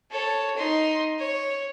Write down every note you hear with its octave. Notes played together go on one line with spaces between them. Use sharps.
A4 C#5
D#4 C6
C#5